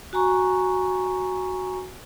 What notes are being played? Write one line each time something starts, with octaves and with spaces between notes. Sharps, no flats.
F#4 G#5 A#5 C#6